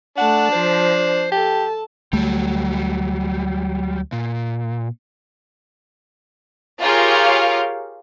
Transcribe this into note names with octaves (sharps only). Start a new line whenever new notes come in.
A3 D4 F#5 A5
F3 C5
G4 A4 A5
D2 F#3 G3 A3
A#2
F4 G4 G#4 A#4 C#5 F5